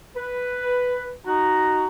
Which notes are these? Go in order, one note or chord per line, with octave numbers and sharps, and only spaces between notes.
B4
D#4 F#4 A#5